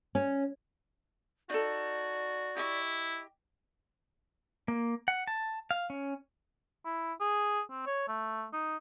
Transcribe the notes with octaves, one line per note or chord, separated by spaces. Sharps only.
C#4
D#4 F#4 A4 D5
E4 G4 D#5 C#6
A#3
F#5
A5
F5
C#4
E4
G#4
C4
C#5
A3
D#4